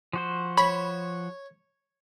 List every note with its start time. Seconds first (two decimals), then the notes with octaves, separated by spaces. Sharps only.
0.13 F3 F#4 C5
0.58 C#5 B5